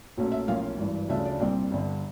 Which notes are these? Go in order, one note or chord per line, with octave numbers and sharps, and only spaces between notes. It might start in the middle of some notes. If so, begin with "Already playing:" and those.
B1 A#2 F#3 A3 C#4
E5
B1 A2 F3 A#3 C#4 F5
G#1 G2 E3
D2 C#3 F3 A3 D4 E5
D5
C2 A#2 G3 C4
G1 G2 D3